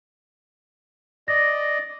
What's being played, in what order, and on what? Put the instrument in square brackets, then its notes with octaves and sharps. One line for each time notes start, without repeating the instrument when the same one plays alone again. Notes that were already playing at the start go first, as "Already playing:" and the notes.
[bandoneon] D5 D#5 [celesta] A#6